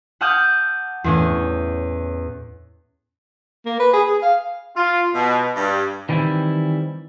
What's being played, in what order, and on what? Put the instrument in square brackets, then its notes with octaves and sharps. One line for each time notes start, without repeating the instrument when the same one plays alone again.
[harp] F#5 A5 D6 D#6 F6 G6
E2 A2 C#4
[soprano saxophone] A#3
B4
G#4
G#4
F5
[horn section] F4
B2
G2
[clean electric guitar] D#3 E3 G3 C4 E4